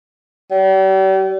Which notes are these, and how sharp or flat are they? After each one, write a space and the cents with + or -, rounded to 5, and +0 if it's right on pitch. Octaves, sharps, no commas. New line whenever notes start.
G3 -40